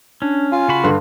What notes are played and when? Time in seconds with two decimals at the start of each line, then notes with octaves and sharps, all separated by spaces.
0.22 C#4 D4
0.52 F4 G#5
0.68 C#3 F#4 B5
0.83 G2 D3 B4 C6